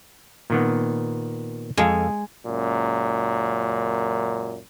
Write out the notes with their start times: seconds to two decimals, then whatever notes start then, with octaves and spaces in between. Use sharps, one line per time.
0.50 A#2 D#3 B3
1.77 F2 G#3 A4 F5
2.46 C#2 F#2 A#2